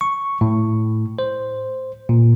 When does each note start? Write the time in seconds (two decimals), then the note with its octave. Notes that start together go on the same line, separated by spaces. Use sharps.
0.01 C#6
0.41 A2
1.19 C5
2.09 A#2